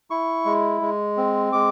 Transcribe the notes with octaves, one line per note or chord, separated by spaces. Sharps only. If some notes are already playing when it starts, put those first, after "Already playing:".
E4 C#6
G#3
G#3
C4
G#3 D6